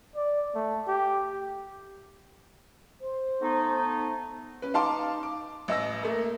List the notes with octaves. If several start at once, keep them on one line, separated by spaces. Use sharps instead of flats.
D5
A3
G4
C5
A3 B3 D#4
C#4 B4
D#4 F5 A5 C6 D6
D6
A1 D#5 E6 A#6
A3 A#3